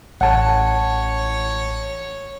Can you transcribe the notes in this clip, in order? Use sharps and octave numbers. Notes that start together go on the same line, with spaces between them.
A1 C#5 F#5 A5